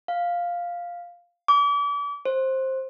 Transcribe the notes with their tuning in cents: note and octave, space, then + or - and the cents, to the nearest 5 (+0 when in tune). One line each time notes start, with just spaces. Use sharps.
F5 +0
D6 -35
C5 +15